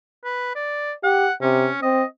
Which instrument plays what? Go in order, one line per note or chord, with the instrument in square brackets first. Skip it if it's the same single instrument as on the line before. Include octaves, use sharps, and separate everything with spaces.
[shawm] B4
D5
[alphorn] G4 [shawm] F#5
[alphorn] C3 [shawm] C#4
[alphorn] C4 [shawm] D#5